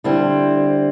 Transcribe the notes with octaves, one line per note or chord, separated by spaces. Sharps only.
D3 G3 C4 E4